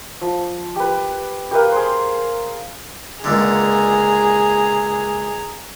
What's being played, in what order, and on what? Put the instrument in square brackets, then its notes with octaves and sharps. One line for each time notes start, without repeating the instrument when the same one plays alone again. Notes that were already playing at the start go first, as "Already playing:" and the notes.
[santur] F3
G4 B4
G4 A#4 B4 F5
G#4 C5
[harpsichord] C#2 A#2 D3 [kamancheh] G#4 A#5